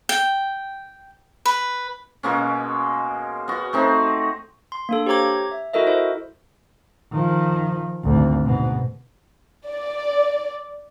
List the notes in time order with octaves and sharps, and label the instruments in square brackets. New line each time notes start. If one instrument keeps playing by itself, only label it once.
[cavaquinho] G5
B4
[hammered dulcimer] B2 G#3 A#3 C#4
B3 F#4
A3 C4 D#4
[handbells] C6
A#3 D4 A4
G4 C5 C#5 A#5 D6 G#6
E5
E4 F#4 A4 A#4 D#5 E5
E4 C5 D#5
[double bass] D#3 F3
G#1 D2
G#2 B2
[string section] D5